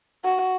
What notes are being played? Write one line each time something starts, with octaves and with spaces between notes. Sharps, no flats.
F#4